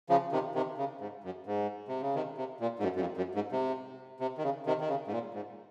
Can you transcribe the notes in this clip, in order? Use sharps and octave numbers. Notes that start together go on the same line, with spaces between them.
C#3 F3
C3 D#3
C3 D#3
C#3
G#2
F#2
G#2
C3
C#3
C3 D#3
C3
A#2
G#2
F#2
F#2
F2
F#2
G#2
C3
C3
D#3
C#3
C3 D#3
D#3
C#3
G#2
A#2
G#2